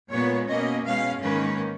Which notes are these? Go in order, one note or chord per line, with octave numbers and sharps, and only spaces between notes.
A#2 G#3 B3 C#5
B2 A#3 C#4 D#5
B2 G#3 C#4 F5
G#2 D#3 A#3 C#4 B4